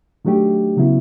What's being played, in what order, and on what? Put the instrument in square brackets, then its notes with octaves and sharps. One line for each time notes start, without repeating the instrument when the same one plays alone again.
[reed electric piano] D#3 F#3 A3 D4 G4
C#3 F#3 B3 E4